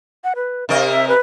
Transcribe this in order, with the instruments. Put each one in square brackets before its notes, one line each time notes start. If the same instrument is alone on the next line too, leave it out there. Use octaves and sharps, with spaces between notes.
[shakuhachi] F#5
B4
[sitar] C3 A#4 D#5 [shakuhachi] F5
[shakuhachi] E5
B4